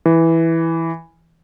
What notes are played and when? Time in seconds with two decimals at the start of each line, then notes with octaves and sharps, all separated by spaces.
0.06 E3